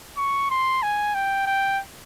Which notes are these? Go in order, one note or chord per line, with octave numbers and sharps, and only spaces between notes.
C#6
C6
G#5
G5
G5